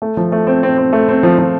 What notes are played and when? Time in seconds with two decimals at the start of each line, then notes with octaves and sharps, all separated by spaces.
0.02 A3
0.17 F3
0.32 A3
0.47 C4
0.63 C4
0.78 C4
0.93 A3
1.08 C4
1.23 F3
1.38 F3